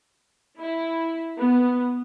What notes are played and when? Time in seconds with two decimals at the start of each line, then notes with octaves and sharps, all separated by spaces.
0.59 E4
1.39 B3